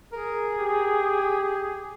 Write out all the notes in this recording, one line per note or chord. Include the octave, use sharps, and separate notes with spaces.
G#4 A#4
G4